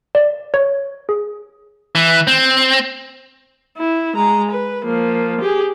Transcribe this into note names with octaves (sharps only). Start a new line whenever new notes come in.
D5
C#5
G#4
E3
C4
E4
G#3 A#5
B4
F3 A#3
G4 G#4